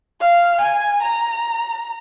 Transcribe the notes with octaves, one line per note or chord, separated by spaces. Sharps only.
F5
G#5
A#5